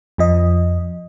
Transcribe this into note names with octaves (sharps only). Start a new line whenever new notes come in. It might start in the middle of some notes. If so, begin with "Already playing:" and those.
F2 F3 D#5